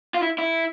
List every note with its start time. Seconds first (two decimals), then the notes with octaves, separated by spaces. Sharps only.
0.14 F4
0.22 E4
0.38 E4